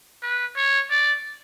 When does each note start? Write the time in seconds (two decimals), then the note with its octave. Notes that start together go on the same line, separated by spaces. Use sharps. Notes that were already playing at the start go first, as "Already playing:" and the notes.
0.22 B4
0.56 C#5
0.90 D5